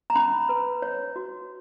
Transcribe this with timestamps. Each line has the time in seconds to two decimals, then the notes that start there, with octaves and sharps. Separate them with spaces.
0.10 A#5
0.15 C#4 B5
0.49 B4
0.82 C#5
1.16 F#4